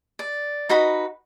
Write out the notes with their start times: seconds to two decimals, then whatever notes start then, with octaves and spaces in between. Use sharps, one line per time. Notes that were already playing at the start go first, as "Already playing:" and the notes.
0.19 D5
0.69 D#4 F#4 B4 B5